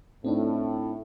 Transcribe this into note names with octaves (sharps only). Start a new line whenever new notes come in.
A2 C4 D4 D#4